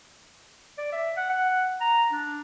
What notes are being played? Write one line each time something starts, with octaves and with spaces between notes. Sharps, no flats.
D5
E5
F#5
F#5
A#5
D4